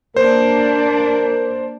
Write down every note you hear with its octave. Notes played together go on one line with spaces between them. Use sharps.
A#3 D4 A#4 C5